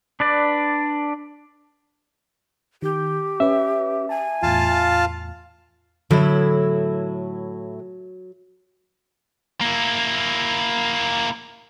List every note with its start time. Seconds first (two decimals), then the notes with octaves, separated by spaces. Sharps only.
0.20 D4 B4 D5
2.82 D#3 G4 G6
3.40 C#4 B4 E5
4.09 G#5 A5
4.43 E2 A2 F4 F5 A5
6.11 A2 D3 F#3 E4
9.61 A#3 E4